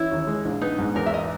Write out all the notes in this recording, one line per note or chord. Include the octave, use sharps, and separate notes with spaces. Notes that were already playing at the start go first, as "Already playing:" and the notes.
Already playing: E3 C#4 E4
D#2
G#3
A#1
B3 D#4
G#2
E2 A#4
E5
D#5